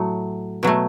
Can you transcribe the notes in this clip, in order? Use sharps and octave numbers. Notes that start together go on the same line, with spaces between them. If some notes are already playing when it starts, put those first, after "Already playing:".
Already playing: A2 F#3 A3
B2 F#3 A3